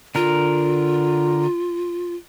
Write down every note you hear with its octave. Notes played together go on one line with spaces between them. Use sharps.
D3 F4 A#4